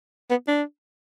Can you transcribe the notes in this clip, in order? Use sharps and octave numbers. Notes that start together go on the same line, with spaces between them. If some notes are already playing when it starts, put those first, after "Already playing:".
B3
D4